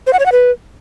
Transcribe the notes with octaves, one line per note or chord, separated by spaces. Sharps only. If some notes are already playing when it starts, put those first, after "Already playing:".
C5
F#5
C#5
F#5
B4